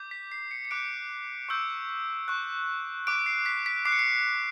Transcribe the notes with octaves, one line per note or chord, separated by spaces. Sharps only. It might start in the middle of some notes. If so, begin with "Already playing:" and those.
Already playing: D6 G6
B6
C7
C#7
C#7
D6 F#6 D7
C#6 E6 G6
C#6 F#6
D6 F#6 D7
C7
B6
B6
D6 F#6 C7
C#7
C7